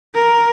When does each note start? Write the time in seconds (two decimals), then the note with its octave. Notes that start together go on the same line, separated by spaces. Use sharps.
0.15 A#4